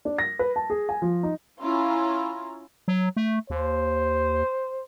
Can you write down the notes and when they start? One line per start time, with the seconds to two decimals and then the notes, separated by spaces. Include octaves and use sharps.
0.05 D4
0.18 A#6
0.39 B4
0.56 A5
0.70 G#4
0.89 G#5
1.02 F3
1.23 D#4
1.60 C#4 E4 F4 A#5
2.88 F#3
3.17 A3
3.50 D#2 C5